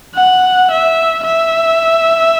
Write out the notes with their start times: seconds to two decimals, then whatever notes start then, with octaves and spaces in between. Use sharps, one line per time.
0.15 F#5
0.71 E5
1.24 E5